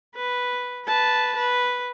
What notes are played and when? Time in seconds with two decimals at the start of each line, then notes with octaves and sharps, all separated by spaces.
0.16 B4
0.86 B4 A5
1.36 B4